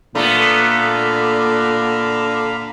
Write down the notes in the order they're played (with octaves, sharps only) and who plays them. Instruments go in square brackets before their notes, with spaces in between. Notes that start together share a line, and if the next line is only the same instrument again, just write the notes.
[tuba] A#2 [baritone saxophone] D3 [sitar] A3 B3 [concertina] F5 A#5 B5